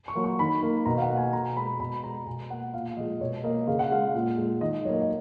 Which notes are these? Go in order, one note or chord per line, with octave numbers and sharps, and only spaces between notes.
C#6
F#3 A#3
C#6
D#3 B5
A#3
B2 A#5
F5
F#5
A#3
G#5
B2 A#5
G#3 B5
B2 B5
G#3 A#5
B2 G#5
A#3 F#5
A#2 F5
F3 G#3 D#5
B2 C#5
A#3 D#5
C#3 F5
F#5
G#3 F5
A#2
G#3
D#3 D#5
F#3 A#3 C#5 D#5
D#5